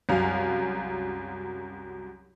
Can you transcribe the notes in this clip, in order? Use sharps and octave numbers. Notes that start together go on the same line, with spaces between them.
C2 F#2 F5